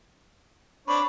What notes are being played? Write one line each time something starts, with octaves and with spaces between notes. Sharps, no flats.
C4 D4 C#5 B5